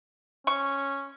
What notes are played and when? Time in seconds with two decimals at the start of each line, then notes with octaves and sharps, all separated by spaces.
0.47 C#4 C#6